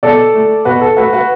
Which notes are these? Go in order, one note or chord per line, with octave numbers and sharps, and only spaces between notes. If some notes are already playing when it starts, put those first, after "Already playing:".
B2 A4 D5
A3
B2 F#4 B4
A4
A3 F#4 B4
F#4 B4